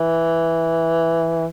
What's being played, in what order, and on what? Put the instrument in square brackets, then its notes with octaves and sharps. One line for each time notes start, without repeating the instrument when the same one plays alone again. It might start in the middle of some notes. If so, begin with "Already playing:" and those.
Already playing: [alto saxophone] E3